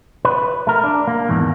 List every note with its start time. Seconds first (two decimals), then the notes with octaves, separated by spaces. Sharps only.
0.25 B4
0.67 A3 A#4
0.84 D4
1.07 A#3
1.29 E2 G#2 D#3 E3